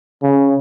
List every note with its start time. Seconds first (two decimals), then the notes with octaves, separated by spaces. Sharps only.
0.22 C#3